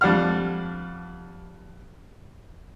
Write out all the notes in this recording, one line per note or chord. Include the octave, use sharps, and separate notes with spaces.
F2 G3 D4 F#5 F6